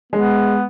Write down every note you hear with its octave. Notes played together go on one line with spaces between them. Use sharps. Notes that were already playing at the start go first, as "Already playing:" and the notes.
G#3 B3